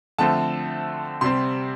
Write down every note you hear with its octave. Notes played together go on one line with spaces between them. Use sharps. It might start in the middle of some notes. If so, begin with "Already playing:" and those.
D3 F3 A3 C4 A5
C3 G3 C4 C6